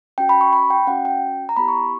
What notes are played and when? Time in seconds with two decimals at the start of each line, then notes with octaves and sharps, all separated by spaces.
0.18 C#4 F#4 G5
0.29 B5
0.41 C#6
0.53 B5
0.70 G5
0.87 C#4 F#4 F#5
1.05 G5
1.49 A#5
1.57 B3 E4 G4 B5
1.68 C#6